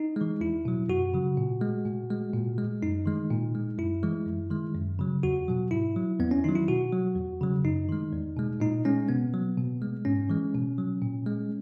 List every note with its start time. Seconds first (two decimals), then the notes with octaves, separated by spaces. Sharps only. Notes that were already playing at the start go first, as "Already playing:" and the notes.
Already playing: D#4
0.16 E3 G#3
0.40 E2 E4
0.65 B2 F#3
0.88 F#2 F#4
1.14 C#3 F#3
1.37 A#2
1.61 G#3
1.85 A#2
2.10 G#3
2.33 A#2
2.58 G#3
2.83 F#2 D#4
3.06 D#3 G#3
3.30 A#2
3.55 G#3
3.78 F#2 E4
4.03 E3 G#3
4.26 F#2
4.51 D#3 G#3
4.75 F#2
4.99 C#3 F#3
5.23 E2 F#4
5.48 B2 F#3
5.71 G#2 E4
5.96 F#3
6.19 E2 B3
6.31 C#4
6.44 D#3 F#3 D#4
6.55 E4
6.68 B2 F#4
6.92 F#3
7.16 E2
7.41 C#3 F#3
7.64 F#2 D#4
7.89 D#3 G#3
8.12 E2
8.36 B2 G#3
8.60 A#2 D#4
8.85 G#3 C#4
9.09 B2 B3
9.34 F#3
9.57 B2
9.82 G#3
10.05 G#2 C#4
10.30 E3 G#3
10.54 B2
10.78 F#3
11.02 A#2
11.26 G#3